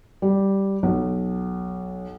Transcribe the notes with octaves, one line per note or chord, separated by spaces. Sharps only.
G3
B1